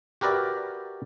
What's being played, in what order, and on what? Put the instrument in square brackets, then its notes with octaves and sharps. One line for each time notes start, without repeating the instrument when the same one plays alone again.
[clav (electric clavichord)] F#4 G4 A#4 B4 D5 E5